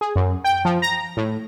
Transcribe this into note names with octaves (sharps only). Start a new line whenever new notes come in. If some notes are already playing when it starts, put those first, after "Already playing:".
G#4
F#2
G5
F3
A#5
A2